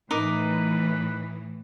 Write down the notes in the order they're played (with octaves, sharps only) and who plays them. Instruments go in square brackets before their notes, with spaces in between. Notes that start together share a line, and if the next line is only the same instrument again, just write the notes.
[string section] A2 E3 [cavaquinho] D#4 A#4 D6 [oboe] B4